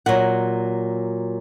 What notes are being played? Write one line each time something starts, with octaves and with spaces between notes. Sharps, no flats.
A#2 F#3 F#5